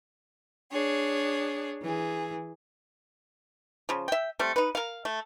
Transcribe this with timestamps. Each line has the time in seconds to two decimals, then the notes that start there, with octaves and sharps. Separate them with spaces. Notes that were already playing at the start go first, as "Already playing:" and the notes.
0.71 D4 G#4 C#5
1.82 E3 G#4
3.89 C#3 F3
4.08 E5 G5
4.39 G3 A3 C4
4.56 D#4 B4
4.75 A#4 F5
5.05 A3